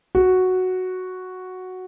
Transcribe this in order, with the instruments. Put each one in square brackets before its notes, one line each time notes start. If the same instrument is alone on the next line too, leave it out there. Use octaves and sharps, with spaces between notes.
[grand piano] F#4